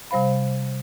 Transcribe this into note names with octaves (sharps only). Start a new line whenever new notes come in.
C3 G3 C5 F5 B5